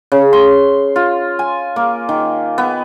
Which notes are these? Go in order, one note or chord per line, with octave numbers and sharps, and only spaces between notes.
C#3
C6
F4
G#5
A#3
D#3
B3